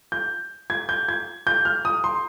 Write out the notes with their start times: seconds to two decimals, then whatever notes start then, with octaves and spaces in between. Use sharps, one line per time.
0.12 G6
0.70 G#6
0.89 G6
1.09 G#6
1.47 G6
1.65 F6
1.85 D#6
2.04 C6